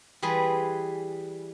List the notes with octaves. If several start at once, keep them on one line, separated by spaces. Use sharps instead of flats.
E3 G3 G#4 B4 C6